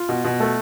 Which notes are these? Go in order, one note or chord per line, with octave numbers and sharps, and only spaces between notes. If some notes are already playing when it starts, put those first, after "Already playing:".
Already playing: F4
B2
B2
A3